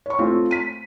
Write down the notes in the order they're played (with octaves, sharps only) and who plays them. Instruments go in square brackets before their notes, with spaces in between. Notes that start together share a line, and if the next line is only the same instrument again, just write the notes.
[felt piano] C#5 C#6
A3 C4 F4
B6 D#7